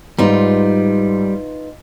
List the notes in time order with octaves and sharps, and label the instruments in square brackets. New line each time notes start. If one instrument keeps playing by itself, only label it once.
[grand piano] G#2 [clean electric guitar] G3 [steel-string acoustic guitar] D#4 F4 B4